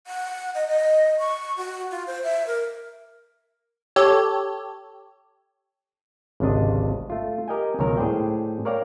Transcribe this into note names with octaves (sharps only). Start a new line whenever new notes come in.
F#5
D#5
D#5
C#6
F#4
F4
C5
E5
A#4
G4 A4 C#5
G#1 C#2 C3 D4 D#5
A3 F4
G4 A#4 D#5 G5 G#5
C#2 B2 D#3 F#3 A#4
A2 G#4 C5 D5 G5
A#4 C#5 D5 F5 G5 A#5